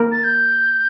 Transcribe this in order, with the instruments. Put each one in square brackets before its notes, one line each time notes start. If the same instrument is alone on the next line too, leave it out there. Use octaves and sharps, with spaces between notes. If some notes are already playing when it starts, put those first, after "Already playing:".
Already playing: [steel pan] A#3 A#4
[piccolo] A6
G6